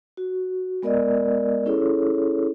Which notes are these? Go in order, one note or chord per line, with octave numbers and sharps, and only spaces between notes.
F#4
G#3 B3 A#4 D5 D#5
C#4 E4 G#4 A4 C#5